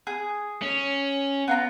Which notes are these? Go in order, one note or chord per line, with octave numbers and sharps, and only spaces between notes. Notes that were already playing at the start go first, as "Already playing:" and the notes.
G#4
C#4
B3 F4 A#5